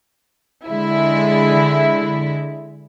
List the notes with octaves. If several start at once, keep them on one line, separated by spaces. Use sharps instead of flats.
D3 G#3 E4